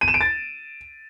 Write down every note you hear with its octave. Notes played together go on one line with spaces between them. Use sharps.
D#7
E7
D7
A6